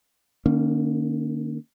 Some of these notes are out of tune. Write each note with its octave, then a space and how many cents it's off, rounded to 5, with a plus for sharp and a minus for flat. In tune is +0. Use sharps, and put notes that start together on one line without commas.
D#3 -45 A#3 +0 C#4 +0